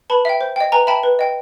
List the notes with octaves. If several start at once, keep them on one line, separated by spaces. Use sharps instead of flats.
B4 A5 B5
E5 G5
C5
D#5 G5
B4 G#5 A#5
E5 G5 A5 B5
B4
D#5 G5